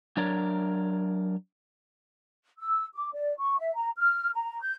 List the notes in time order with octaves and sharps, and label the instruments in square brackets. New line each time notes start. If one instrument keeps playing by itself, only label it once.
[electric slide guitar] F#3 D4 A#4 C#5 D5
[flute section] E6
D6
D5
C#6
E5
A#5
F6
A#5
G6